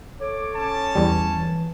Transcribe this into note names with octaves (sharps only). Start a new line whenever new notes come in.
A4 C#5 D6
C#4 A5
E2 G3
E3